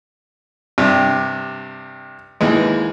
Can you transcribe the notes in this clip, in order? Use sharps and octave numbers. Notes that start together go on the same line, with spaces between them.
G2 C3
D#2 E3 G#3